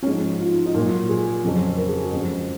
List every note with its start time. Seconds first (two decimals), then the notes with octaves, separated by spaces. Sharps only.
0.03 C#4
0.06 G#2 F3 G#3 D#4
0.40 F4
0.66 D#4
0.75 A#2 F#3 F4
1.09 G#4
1.44 F2 C#3 F#3
1.77 A#4
1.89 G#4
2.00 F#4
2.12 F2 C#3 G#3